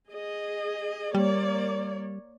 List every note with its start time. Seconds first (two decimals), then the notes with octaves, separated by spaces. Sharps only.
0.12 G#4 D#5
1.15 G3 A#3 C#5 D5